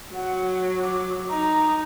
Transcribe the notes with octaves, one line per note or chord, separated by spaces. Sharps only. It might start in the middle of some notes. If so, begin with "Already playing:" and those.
F#3 F#5
D6
D#4 A#5